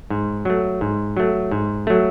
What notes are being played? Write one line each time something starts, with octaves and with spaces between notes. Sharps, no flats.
G#2
F#3 A3
G#2
F#3 A3
G#2
F#3 A3